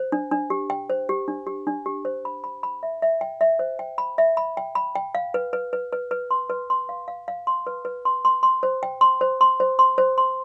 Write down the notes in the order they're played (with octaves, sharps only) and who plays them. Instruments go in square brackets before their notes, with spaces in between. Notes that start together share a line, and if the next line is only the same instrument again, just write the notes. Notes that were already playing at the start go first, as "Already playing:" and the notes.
Already playing: [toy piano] C5
D4
D4
G4
G5
C5
G4
D4
G4
D4
G4
C5
B5
B5
B5
E5
E5
G5
E5
C5
G5
B5
E5
B5
G5
B5
G5
F5
B4
B4
B4
B4
B4
C6
B4
C6
F5
F5
F5
C6
B4
B4
C6
C6
C6
C5
G5
C6
C5
C6
C5
C6
C5
C6